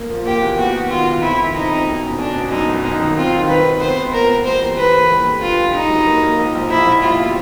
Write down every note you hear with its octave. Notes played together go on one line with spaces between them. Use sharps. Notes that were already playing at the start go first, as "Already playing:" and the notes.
Already playing: A#3
F3
A#3 G4
E2
B3 F#4
B3
D#3 F4
D#3
F2 E4
D#3
F2 D#4
F2
B2
C#4
C#4 D4
B2
F#2 D#4
G1
F#2 D#4
D#3
C4 F4
D#3
D#3 B4
D#3
B3 C5
B3
A#2 A#4
B3
G3 C5
E3
E3 B4
A#3
G3
D3
G3 F4
G3
G2 D#4
F#3
A#3
A#3
A#1
A#1
A#1 E4
A#1
G3 F4
B2